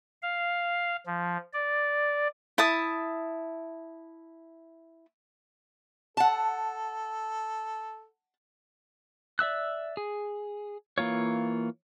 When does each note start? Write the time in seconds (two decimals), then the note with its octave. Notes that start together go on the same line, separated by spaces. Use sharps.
0.22 F5
1.06 F3
1.53 D5
2.58 E4 A5 D#6
6.17 A4 F#5 A5
9.39 D5 E5 E6 F#6
9.97 G#4
10.98 E3 A#3 F4 C#5